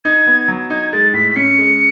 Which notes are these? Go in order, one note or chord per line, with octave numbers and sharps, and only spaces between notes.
D#4 G#6
B3
F#3
D#4 G#6
G#3 A6
A2 B6
B6
C#4 C#7
G#3